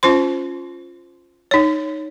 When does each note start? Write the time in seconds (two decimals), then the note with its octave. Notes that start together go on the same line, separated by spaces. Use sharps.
0.03 C#4 F4 C5 C6
1.51 D#4 C#5